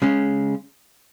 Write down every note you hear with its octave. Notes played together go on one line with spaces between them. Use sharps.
C#3 G#3 C#4